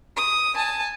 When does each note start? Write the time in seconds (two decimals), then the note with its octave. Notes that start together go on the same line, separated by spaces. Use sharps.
0.17 D#6
0.54 G#5 A5